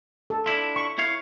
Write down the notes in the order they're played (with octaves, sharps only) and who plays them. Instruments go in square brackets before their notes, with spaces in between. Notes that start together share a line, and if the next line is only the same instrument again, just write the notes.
[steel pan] A4
[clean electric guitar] D4 E4 F4
[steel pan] C#6
[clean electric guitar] E4 C#5 F5